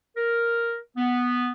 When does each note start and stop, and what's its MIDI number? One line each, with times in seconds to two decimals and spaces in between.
0.16 0.76 70
0.97 1.52 59